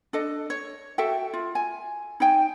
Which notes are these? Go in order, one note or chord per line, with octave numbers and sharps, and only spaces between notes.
D4 A4 D#5
C#5
F#4 A4 E5 G5
F4
G#5
D#4 C#5 G5 G#5